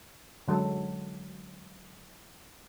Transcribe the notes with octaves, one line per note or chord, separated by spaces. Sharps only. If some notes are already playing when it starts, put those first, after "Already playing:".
D3 F#3 G#3 A4